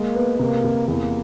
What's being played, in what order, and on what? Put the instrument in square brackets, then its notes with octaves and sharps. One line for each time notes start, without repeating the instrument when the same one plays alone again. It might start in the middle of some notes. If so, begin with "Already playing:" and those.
Already playing: [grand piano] G#3 [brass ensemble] A#3
[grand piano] B3
[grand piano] C3 [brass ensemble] A#3
[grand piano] C3
[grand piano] E2 [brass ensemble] A#3